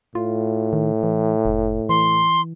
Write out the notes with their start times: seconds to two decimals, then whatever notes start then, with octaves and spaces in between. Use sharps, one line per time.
0.15 A2 F4
0.73 D#3
1.03 E3
1.45 F1
1.89 E3 C6